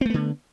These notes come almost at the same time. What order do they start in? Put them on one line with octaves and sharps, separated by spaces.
C4 A3 B3 D3